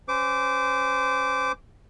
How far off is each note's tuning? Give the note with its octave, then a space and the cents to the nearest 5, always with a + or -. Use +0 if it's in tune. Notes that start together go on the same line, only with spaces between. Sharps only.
C#4 -10 C5 -30 D6 -10